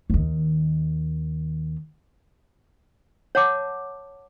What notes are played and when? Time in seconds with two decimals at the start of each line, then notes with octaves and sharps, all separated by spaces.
0.10 D#2 D#3
3.35 C#5 F#5 A5 D6